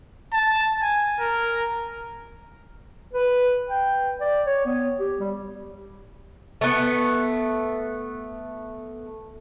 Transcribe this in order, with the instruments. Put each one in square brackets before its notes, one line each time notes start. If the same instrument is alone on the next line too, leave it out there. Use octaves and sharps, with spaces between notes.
[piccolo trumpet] A5
G#5
A#4
[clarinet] B4
G5
D5
C#5
B3
G4
G3
[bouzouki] A3 B3